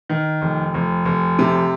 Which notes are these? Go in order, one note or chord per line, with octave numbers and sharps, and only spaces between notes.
D#3
F1
F1
F1
C3